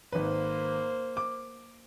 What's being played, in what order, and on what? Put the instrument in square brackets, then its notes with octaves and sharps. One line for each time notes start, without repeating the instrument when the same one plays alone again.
[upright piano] G#1 B4 [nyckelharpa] A#3 C5
[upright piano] D6